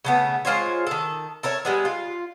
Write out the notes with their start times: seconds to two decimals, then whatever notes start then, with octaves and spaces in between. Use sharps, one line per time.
0.05 C#3 A3 B3
0.45 G#3 F4 C5 C#5
0.87 D#3 A4
1.43 A4 A#4 C#5 E5
1.65 G3 G#3 B3
1.85 F4